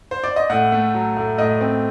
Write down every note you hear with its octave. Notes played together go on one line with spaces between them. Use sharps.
C5
D5
D#5
A2 F#5
A3
F#3
A2
A2 D#5
C4